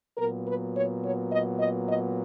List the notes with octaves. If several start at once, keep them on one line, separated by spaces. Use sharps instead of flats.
A#2 F#3 B3 A#4
B4
C#5
C#5
D#5
D#5
D#5